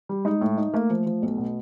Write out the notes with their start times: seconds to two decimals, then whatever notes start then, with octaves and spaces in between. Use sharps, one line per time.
0.09 G3
0.25 G#3 D#4
0.41 A2
0.57 D#4
0.73 A3 A#3
0.90 F3
1.06 F3
1.22 B1
1.38 B2